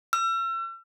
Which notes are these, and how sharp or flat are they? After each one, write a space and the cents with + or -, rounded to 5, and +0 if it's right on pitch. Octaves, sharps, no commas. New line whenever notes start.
E6 +40